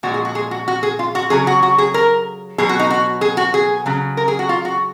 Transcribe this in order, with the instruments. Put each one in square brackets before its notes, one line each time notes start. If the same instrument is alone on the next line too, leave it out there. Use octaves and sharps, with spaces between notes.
[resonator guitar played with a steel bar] A#2 F3 G#3 F#4
G#4
F#4
G#4
F#4
F#4
G#4
F4
F#4
C#3 F#3 G#4
F#4
F#4
G#4
A#4
B2 F#3 G#4
F#4
D#4
F#4
G#4
F#4
G#4
C#3 F#3
A#4
G#4
F#4
F4
F#4